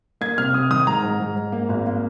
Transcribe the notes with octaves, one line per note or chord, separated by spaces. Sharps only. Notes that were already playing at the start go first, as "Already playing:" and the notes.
A#3 G#6
C3 F6
C3 D#6
D#3 D#6
G#2 A#5
G#2
G#2
G#2
A#3
G#1
A#3